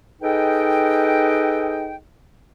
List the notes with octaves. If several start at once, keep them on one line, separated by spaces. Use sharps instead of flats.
D#4 G#4 A4 B4 D#5 G5